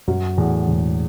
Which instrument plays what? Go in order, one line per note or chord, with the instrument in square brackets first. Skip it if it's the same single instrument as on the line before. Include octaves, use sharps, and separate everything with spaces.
[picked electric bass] F#2 [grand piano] F#3
[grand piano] E2 [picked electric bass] A2
[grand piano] E1